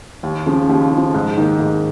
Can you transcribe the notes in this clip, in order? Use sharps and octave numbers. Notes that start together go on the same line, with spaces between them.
D#2
C#3 F3
D#2
C#3
F3
G#2
D#3 A#3
G#2